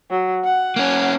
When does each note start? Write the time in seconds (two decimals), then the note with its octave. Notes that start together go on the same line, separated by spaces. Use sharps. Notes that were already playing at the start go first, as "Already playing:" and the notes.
0.10 F#3
0.44 F#5
0.76 A#3 C#4